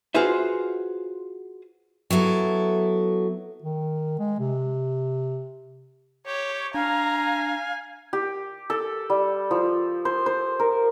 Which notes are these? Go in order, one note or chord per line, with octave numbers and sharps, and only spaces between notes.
F4 F#4 G#4 B4 C5 E5
F#3 B3 E4 A4
D#3
G#3
C3
G4 C#5
D4 F5 G#5 A#5
G4
A4
G3
F3
C5
C5
A#4